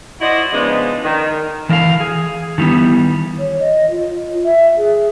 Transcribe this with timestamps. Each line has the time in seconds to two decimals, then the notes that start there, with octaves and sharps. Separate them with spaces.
0.21 E4 F#4 C5 D5 D#5
0.53 C#3 F3 G#3 B3 D4 D#4
1.03 D#3
1.69 E3 A#4 D#5 F5
2.00 G#4
2.58 D#3 E3 G3 B3
3.38 C#5
3.59 D#5
3.90 F4
4.44 E5
4.77 G#4